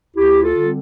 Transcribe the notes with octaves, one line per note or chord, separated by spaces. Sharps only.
D2 E4 G4
F4 A4
D3 G3 C4